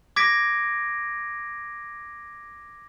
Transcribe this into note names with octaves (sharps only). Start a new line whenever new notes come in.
D6 G#6 A#6 B6 D7